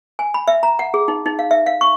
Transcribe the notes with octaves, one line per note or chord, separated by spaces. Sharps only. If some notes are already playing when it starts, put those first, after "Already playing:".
G#5
B5
E5
A#5
F#5
G#4
D#4
D#4
F5
E5
F5
C#6